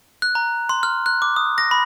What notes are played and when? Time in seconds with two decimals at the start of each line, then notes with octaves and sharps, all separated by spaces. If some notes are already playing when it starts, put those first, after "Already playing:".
0.22 F#6
0.35 A#5
0.69 C6
0.83 F6
1.06 F#6
1.22 D6
1.36 D#6
1.58 A#6
1.71 B5